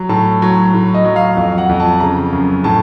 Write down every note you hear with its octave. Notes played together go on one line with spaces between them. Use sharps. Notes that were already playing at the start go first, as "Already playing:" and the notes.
Already playing: F#3
A2 A5
F#3
A2
D#5
F#3
F5
F2 F5
F#5
F2
A5
C#3 A#5
F#2
A2 A5